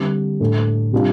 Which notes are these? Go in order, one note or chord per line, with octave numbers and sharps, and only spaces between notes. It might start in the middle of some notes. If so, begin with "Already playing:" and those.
Already playing: D3 G3 C4
A2 A3 D4
C3 G3 D4 F4